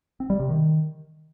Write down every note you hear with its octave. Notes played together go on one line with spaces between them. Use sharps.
C4
G3
C3
D#3